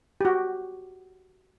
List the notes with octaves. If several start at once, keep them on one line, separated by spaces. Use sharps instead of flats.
F#4 G4